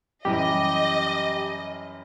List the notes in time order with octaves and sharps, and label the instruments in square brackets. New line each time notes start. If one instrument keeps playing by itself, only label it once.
[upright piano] F#2 E3 G3 [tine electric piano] G4 [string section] D#5